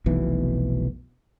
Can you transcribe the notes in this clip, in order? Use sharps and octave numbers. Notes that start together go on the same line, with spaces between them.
F1 B1 B2 E3